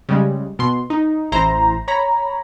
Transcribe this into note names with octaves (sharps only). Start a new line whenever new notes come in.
C#3 G3 G#3
B2 C6
D#4
A1 E4 C5 A#5
C#5 A#5 B5